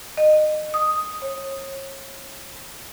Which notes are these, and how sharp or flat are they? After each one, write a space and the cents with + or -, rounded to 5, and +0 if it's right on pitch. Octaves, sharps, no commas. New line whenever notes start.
D#5 -25
D#6 +0
C#5 -35